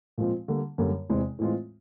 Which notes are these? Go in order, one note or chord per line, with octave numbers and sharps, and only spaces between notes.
A#2 F3 G#3 C4 F4
D3 G3 A#3
F#2 D3 G3 A#3
E2 C3 E3 G#3 C4
A2 E3 G#3 C4 F4